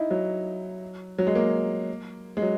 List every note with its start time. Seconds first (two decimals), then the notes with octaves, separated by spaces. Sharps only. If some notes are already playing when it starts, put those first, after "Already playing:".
Already playing: D#4 E4
0.11 F#3
1.18 F#3
1.27 G#3
1.35 A#3
2.37 G#3
2.42 F#3